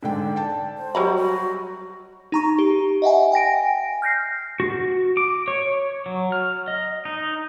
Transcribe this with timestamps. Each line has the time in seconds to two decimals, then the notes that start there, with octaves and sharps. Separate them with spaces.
0.03 G#2 D3 D5 G5
0.36 G5 A5
0.77 C5
0.95 F#3 G3 C#5 D#5 A#5 B5
1.16 F#4
2.32 D#4 A#5 C#6
2.59 G4
3.02 D#5 E5 F#5 G#5
3.32 G5 G#5 A#6 D7
4.02 F6 G6 A#6 C7
4.60 F#4
5.17 D6
5.48 C#5
6.06 F#3
6.32 F6
6.68 D#5
7.05 D#4